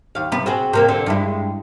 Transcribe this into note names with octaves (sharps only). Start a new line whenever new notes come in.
D#2 F5
C3 B3
C4 F#4 G#4
C3 A#3 C4
D3 C4
G2 G#3 E4